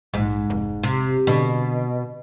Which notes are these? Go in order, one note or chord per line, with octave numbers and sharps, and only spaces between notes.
A#1 G#2
F1
C3
B2 D3